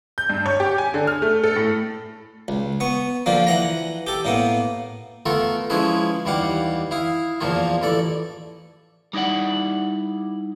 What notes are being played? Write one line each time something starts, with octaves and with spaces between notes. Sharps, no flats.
G6
G2
C#5
G4
G#5
D3
F6
A3
A4
A2
C#2
B3 C#6
D3 F3 A#3
E3 F#5 A#5
G4 A4
A2 A#3 B3
A3 B3 F4 A4 A#4
F3 G#3 C#4 E4 G#4 B4
D#2 E3 G3 F5 F#5 D6
E4 F5 D#6
E2 A#2 F3 A#3 F4
A1 E3 A4 D5
G3 D#4 E4 D5 F#5